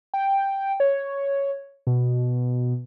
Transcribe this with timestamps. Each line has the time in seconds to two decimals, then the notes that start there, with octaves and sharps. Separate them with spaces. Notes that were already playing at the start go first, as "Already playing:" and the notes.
0.14 G5
0.80 C#5
1.87 B2